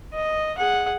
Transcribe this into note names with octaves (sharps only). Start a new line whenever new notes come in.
D#5
G#4 F#5